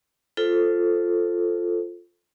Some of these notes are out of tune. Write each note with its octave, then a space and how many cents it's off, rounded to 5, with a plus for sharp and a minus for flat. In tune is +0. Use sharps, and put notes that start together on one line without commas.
F4 +0 A4 +0 C5 +0